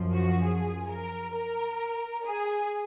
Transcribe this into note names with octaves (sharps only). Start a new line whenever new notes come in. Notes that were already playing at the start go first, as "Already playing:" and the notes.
Already playing: F#2 F3
F#4
G#4
A#4
A#4
G#4